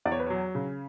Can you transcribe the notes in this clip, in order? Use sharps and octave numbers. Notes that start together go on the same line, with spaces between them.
E2 D5
C#5
B4
F#3 C#5
C#3